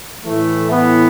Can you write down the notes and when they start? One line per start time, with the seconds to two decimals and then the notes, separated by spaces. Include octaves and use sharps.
0.24 A2 E3 A3
0.70 B3